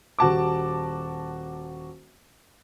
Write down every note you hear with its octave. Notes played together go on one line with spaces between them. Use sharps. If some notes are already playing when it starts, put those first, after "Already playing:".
D#1 F#4 A5 D6